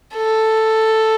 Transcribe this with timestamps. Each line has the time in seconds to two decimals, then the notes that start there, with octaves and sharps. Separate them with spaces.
0.15 A4